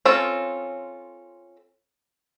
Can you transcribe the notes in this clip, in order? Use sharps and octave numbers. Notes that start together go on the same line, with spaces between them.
C4 C#4 F4 A4